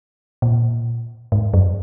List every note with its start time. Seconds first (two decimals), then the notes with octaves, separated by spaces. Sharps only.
0.42 A#2
1.32 G#2
1.54 F#2